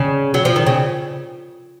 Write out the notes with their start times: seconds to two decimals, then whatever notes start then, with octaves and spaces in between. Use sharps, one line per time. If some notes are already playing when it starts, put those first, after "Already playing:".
Already playing: C#3
0.34 F#3
0.45 F3
0.56 D#3
0.66 C#3